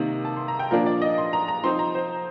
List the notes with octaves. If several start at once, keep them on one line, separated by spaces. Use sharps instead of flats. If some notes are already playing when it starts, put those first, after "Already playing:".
Already playing: C3 D#3 A#3 D#4
A5
C6
A#5
G5
A#2 F3 A#3 D4 A#4
D5
D#5
C6
A#5
A#5
F3 C4 D#4 C6
A#5
C5